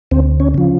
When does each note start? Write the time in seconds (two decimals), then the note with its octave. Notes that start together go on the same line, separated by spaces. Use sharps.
0.11 D2 C4
0.40 C#4
0.54 C#3 F3